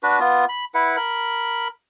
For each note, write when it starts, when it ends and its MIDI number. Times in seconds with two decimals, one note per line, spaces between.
0.03 0.20 62
0.03 0.20 66
0.03 0.20 71
0.20 0.45 59
0.20 0.45 65
0.49 0.65 83
0.74 0.96 64
0.74 0.96 71
0.74 0.96 78
0.97 1.68 70
0.97 1.68 83